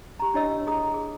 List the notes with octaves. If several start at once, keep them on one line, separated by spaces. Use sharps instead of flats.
G4 A#5
D4 E4 C#5 D#5 E6
G#4 A#5 D#6
G#4